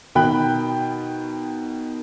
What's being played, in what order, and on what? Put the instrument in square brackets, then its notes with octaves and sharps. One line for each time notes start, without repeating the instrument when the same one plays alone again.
[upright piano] B2 D#3 G5 B5 F#6